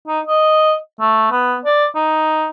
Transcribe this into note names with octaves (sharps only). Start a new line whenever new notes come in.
D#4
D#5
A3
B3
D5
D#4